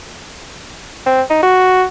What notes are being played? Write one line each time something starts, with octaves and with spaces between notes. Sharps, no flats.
C4
D#4
F#4